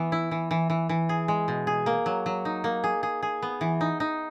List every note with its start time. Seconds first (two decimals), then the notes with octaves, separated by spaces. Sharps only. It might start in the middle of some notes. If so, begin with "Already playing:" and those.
Already playing: E3 B3
0.12 E4
0.31 E3
0.51 E3
0.70 E3
0.89 E3
1.09 G#4
1.28 G#3
1.48 B2
1.67 G#4
1.86 A#3
2.06 F#3
2.26 F#3
2.45 D#4
2.64 A#3
2.84 G#4
3.03 G#4
3.23 G#4
3.42 B3
3.61 E3
3.81 D#4
4.00 D#4